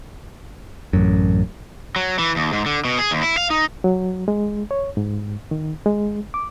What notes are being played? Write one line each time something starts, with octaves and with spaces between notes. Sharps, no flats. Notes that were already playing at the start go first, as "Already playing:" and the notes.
A1 F#2
F#3
E3
D#2
G#2
D3
B2
G#4
D#2
E4
F5
D#4
F#3
G#3
C#5
G#2
D#3
G#3
D6